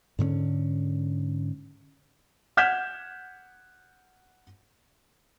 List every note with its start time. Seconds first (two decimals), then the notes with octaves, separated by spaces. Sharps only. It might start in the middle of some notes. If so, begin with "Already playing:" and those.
0.19 G#2 D3 C4 C#4
2.57 F#5 F6 G6 G#6 B6 E7